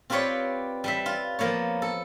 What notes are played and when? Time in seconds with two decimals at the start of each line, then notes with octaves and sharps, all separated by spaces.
0.10 C4 F4 G4 B4 C#5 D5
0.84 G3 B4 E5
1.06 F4
1.39 F3 A#3 B3 C#5
1.82 A4